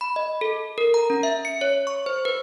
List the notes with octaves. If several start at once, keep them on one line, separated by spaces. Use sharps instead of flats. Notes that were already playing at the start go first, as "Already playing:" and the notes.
B5
D#5
A4
A#4
A#5
C#4
E5
C#7
C#5
C#6
C5
B4